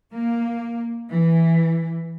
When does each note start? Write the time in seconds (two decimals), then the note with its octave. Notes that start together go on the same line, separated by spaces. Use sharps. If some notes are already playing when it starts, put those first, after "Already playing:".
0.14 A#3
1.12 E3